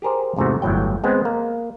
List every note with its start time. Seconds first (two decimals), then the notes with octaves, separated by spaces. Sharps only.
0.02 G4 G#4 A#4 C5
0.36 E2 G#2 C3 A3 F#4
0.62 G1 E2 A2 F#3 G5
1.04 G#3 B3 C4 C5
1.25 A#3